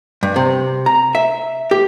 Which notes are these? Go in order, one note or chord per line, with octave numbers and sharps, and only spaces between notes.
G2
C3
A#5
E5
G4